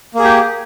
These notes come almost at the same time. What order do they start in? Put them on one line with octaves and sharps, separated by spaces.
A#3 G#4 G4